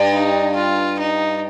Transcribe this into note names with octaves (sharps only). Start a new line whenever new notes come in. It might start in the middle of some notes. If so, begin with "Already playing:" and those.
Already playing: G2
D#4
F4
D#4